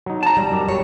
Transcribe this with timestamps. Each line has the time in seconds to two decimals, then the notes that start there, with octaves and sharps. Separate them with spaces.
0.06 F#3 D#4
0.23 A5 A#5
0.37 G3
0.51 F#2 D5
0.68 F#2 F#3 G3 C#5